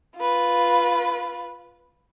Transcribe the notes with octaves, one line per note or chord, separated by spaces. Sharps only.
F4 B4